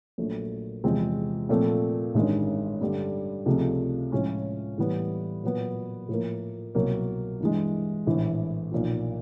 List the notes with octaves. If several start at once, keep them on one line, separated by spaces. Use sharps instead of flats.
A#1 A#2 F#3 A3
E2 C3 F3 G#3 C4
A#2 F3 A3 C4
A1 G2 D#3 G#3 C#4
G2 D3 G3
C#2 C3 F3 A3
A2 F3 G#3 C#4 F4
A2 E3 G3 B3
A#2 F#3 B3
A2 F3 A#3
C2 B2 F#3 A#3
G2 E3 G#3
A#1 A2 E3
B1 A#2 F3